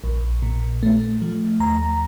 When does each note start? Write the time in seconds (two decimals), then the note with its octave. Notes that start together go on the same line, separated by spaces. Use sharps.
0.04 A#1
0.42 A#2
0.83 A3
1.22 F3
1.60 D#2 A#5